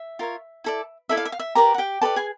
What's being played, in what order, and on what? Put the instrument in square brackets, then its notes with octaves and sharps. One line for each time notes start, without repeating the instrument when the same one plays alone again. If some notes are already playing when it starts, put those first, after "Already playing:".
Already playing: [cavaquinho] E5
F4 A#4 C#5
E4 A4 D5
E4 A4 D5 E5
F5
E5
F5
E5
G4 A#4 B4 D5 A#5
F#5
G4 G5
G4 A4 B4 D5 A5
G#4 G#5